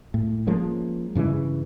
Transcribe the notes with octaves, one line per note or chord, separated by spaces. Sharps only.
A2
F3 G#3 A#3 C#4
G2 C#3 E3 G#3